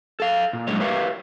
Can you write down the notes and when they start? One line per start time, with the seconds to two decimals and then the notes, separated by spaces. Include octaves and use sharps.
0.20 A4 F5
0.53 A#2
0.67 F#2 A2 D3 G#3 C#5
0.80 G4 A#4 B4 C#5 E5 F5